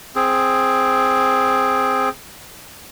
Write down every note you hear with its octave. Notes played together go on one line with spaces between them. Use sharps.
C4 G#4